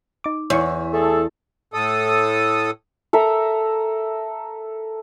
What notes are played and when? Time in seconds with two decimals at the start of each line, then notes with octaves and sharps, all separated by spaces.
0.24 D#4 D6
0.50 E2 C#5 C#6
0.93 A3 G#4 A4
1.74 A2 A4 D#6
3.13 A4 A#4 E5 A#5